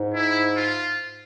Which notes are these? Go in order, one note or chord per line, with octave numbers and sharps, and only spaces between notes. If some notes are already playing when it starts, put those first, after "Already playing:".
Already playing: G#2
E4
F4